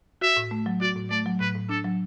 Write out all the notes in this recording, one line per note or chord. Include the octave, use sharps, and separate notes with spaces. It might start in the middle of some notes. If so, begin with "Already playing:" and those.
F#4 E5
A2
A3
F#3
F#4 D5
A2
A3 D5
F#3
A2 B4
A2
D4 A4
F#3